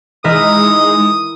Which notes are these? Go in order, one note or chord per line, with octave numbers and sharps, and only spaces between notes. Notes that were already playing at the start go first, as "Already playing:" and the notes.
E3 G#3 D#4 A#4 E5 D#6